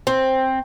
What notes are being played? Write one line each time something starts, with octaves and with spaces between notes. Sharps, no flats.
C4